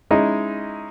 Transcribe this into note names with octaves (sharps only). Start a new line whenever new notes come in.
G#3 C#4 D#4 E4 D#5